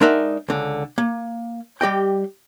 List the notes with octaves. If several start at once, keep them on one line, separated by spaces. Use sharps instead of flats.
G#3 D4 D#4 A#4 E5 F#5
C#2 D3
A#3
G3 G4 D#5 G5